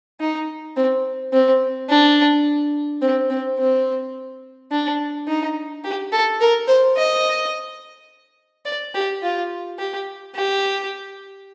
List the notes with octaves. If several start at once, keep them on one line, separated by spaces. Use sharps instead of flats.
D#4
C4
C4
D4
C4
C4
C4
D4
D#4
G4
A4
A#4
C5
D#5
D5
G4
F4
G4
G4